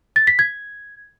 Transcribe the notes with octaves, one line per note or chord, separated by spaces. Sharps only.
A6
B6
G#6